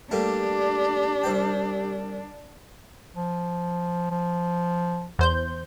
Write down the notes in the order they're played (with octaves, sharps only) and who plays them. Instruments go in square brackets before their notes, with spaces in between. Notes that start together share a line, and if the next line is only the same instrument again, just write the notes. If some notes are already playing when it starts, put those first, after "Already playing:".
[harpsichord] G3 A3 A#3 [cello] D4 [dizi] G4
[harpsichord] C2 C5 G5
[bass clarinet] F3
F3
[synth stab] E2 C5 G6